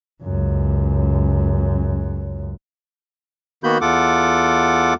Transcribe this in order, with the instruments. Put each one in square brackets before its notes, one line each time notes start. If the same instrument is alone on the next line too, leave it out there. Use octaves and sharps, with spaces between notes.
[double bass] C#2 F#2
[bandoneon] D#3 A#3 B3 F#4 B5 G6
E2 F4 A4 F#5 D6